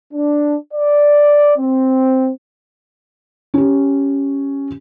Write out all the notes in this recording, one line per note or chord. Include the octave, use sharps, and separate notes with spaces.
D4
D5
C4
C#4 G4